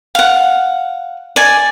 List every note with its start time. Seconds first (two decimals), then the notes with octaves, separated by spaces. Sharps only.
0.15 F5 F#5
1.36 D5 G#5